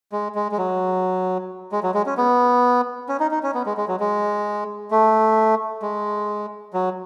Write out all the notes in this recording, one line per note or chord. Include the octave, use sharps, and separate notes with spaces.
G#3
G#3
G#3
F#3
G#3
F#3
G#3
C#4
B3
C#4
D#4
D#4
C#4
B3
G#3
G#3
F#3
G#3
A3
G#3
F#3